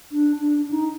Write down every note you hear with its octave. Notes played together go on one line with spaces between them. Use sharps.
D4
D4
D#4